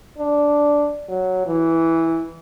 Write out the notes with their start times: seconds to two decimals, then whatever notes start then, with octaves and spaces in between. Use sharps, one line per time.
0.18 D4
1.09 F#3
1.47 E3